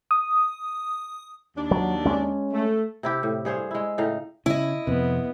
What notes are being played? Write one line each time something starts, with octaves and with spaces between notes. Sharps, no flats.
D#6
D#2 D4
F#3
G#3 C#4
A3
C3 E4 G4
A2
G2 G#4 C5 C#5
G#3 E4
A2 C#3 D#4 F5
C#3 E4 D#5
F2 C3 B3